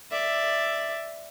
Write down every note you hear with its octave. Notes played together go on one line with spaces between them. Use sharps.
D5 E5